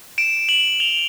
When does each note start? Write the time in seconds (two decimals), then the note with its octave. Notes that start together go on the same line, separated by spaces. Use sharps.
0.18 D7 E7
0.48 E7 F#7
0.80 F7 G7